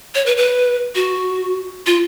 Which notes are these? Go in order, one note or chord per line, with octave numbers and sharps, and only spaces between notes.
C#5
B4
B4
F#4
F4